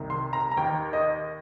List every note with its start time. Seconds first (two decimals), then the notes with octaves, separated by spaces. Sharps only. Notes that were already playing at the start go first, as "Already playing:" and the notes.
Already playing: C2 C3 D#3
0.10 C6
0.33 A#5
0.51 A#5
0.57 D#2 D#3 G5
0.93 D#5